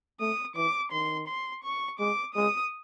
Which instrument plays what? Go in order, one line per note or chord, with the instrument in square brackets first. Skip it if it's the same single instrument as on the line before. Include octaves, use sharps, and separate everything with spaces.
[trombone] A3 [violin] D#6
[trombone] E3 [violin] D6
[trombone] D#3 [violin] C6
[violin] C6
C#6
[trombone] G#3 [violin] D6
[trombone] G#3 [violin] D#6